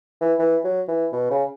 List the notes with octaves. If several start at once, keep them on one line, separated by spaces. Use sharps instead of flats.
E3
E3
F#3
E3
B2
C#3